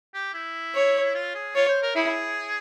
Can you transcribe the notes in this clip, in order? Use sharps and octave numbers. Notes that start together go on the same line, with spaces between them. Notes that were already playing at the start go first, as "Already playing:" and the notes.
G4
E4
C#5
F4
G#4
F4 C#5
C5
A#4
E4 G#4